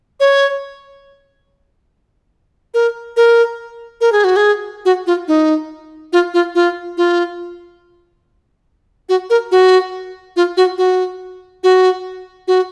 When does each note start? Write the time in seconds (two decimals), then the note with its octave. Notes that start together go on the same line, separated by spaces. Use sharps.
0.20 C#5
2.74 A#4
3.17 A#4
4.01 A#4
4.12 G#4
4.24 F#4
4.36 G#4
4.85 F#4
5.07 F4
5.28 D#4
6.13 F4
6.34 F4
6.55 F4
6.97 F4
9.09 F#4
9.30 A#4
9.52 F#4
10.36 F4
10.57 F#4
10.78 F#4
11.64 F#4
12.48 F#4